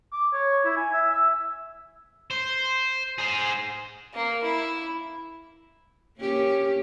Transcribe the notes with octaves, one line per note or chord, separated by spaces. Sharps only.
D6
C#5
E4
G#5
E5
E6
C5
G#4 C5
A#3
E4
A#3 C#4 G4